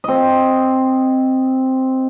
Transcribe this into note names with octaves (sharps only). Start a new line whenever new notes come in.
C4 D#5